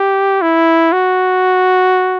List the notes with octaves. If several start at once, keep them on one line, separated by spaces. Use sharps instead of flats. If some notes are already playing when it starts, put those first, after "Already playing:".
Already playing: G4
E4
F#4